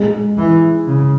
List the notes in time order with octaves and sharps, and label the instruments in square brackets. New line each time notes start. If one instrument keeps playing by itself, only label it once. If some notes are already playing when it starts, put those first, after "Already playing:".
Already playing: [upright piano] G#3
[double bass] E3
C#3